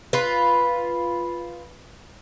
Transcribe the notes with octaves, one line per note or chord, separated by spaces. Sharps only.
F4 B4